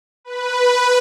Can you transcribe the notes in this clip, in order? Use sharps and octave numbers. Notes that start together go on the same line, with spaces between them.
B4